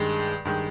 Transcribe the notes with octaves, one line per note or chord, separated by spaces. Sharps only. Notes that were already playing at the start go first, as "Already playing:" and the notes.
Already playing: G2 D#3 G#3
G2 D#3 G#3